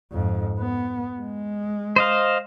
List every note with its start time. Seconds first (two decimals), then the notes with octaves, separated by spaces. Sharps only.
0.12 F2 G#2
0.59 B3
1.20 G#3
1.96 C5 D#5 F5